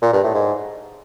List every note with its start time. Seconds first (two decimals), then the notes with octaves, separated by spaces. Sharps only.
0.02 A#2
0.13 G2
0.23 A2
0.34 G#2